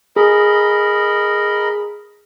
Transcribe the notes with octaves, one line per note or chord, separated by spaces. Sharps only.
G#4 A#4 D#5 B5